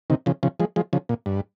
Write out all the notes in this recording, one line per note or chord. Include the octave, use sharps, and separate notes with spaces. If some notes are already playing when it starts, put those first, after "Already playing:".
C3 D#3
C#3 F3
C#3 F3
F3 G#3
F3 G#3
C#3 F3
A#2
G2